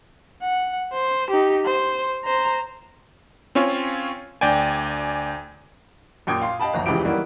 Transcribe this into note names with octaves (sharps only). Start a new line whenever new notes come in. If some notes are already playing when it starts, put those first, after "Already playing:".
F#5
C5
D#4 G4
C5
C5 A#5
C4 C#4 F4 C#5 G#5
D2 D5 G5 G#5
F#2 A#2 G5 D#6 G#6
F5 C6
D#5 F5 G5 A5 B5
F#1 D2 F3 A#5
F1 C#2 C#3 E3 G4 D7
D#3 F#3 G3 A#3 B3 E4